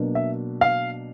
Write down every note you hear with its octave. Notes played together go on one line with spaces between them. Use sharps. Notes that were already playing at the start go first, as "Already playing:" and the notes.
Already playing: B2 F#3 A#3 D4
E5
F5